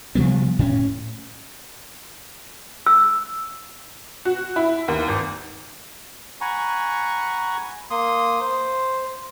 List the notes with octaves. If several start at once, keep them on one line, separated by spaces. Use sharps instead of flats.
C3 F3 G3 B3
A2 C#4
E6
F#4
E4
D#2
G#1
F#5 G#5 A#5 B5 C#6
A#3 C6 D#6
C5